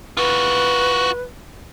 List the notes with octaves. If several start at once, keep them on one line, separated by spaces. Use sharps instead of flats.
F4 F#4 B4